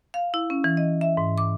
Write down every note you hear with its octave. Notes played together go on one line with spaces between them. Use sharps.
F5
E4
C#4
E3
D#5
E5
G#2
D6